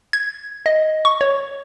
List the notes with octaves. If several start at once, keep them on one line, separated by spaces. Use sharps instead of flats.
G#6
D#5
C#6
C#5